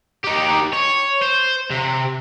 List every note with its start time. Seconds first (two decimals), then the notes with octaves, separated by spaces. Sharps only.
0.24 D#4 G4
0.73 C#5
1.22 C5
1.71 C3